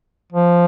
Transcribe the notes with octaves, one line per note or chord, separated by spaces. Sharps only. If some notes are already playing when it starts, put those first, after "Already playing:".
F3